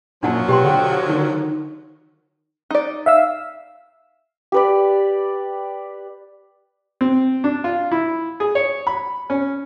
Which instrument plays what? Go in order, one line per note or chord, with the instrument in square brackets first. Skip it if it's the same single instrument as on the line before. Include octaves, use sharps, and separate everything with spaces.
[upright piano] F#2 [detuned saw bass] A#2 [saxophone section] F3 F#3 [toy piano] D4 F#5 A5
[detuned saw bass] B2 [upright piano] B3 [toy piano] G4 G5 C6
[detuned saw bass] D3 [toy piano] A4 [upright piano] F#5 G5
[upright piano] D#3
[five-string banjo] D#4 D5
[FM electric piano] E5 F5 E6
[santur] G4 B4 D5
[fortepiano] C4
D4
F4
E4
G#4
C#5
B5
C#4